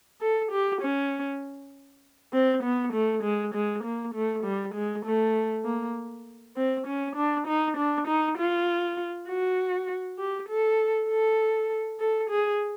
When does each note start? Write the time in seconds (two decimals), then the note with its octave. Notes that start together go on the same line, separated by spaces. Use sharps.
0.21 A4
0.52 G4
0.81 C#4
2.33 C4
2.63 B3
2.93 A3
3.23 G#3
3.54 G#3
3.84 A#3
4.15 A3
4.44 G3
4.74 G#3
5.06 A3
5.65 A#3
6.57 C4
6.87 C#4
7.16 D4
7.47 D#4
7.77 D4
8.07 D#4
8.38 F4
9.28 F#4
10.18 G4
10.49 A4
11.10 A4
12.00 A4
12.30 G#4